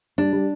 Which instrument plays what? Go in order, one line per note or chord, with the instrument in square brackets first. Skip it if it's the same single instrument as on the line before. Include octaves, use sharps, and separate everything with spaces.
[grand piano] G3 [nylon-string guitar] D4
[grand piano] G3